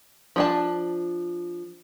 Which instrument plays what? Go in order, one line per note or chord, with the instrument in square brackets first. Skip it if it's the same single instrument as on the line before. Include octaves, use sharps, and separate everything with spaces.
[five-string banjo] F3 D4 A5